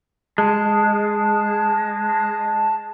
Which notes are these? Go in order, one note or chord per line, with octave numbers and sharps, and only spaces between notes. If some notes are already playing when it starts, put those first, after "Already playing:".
G#3 A5